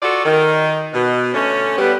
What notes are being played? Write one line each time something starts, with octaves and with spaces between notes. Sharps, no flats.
F4 F#4 A4 D5
D#3
B2
D3 A3 C#4
G3 B3